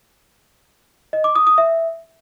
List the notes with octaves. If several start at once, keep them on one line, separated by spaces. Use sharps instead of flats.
D#5
D6
D#6
D#6
E5